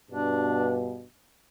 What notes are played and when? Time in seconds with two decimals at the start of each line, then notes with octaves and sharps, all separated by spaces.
0.11 G2 B2 D4